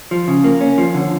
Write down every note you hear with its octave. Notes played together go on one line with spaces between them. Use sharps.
F3
C#3
A#3
C#4
F3
D3